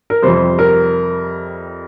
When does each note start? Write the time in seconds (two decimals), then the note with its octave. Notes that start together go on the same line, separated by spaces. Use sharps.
0.10 A#4
0.22 F2 C3 G3 C5
0.59 A#4